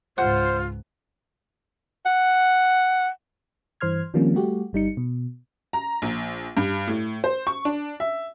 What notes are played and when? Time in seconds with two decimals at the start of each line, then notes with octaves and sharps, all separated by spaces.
0.18 C#2 G#2 F4 C5 F#5
2.06 F#5
3.81 G2 E3 C5 C6 F6 G#6
4.14 D#3 F3 G3 A#3 C4 C#4
4.34 G3 A3 F#4 G4
4.73 G1 G3 D#4 C#7
4.97 B2
5.73 A#5
6.02 A#1
6.57 G2
6.88 A2
7.24 C5
7.47 C#6
7.65 D4
8.00 E5